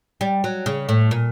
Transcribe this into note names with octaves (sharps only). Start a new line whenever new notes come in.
G3
F#3
C#3
A2
A#2